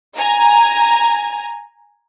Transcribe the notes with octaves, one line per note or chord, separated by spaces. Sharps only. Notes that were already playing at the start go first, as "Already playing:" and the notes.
G#5 A#5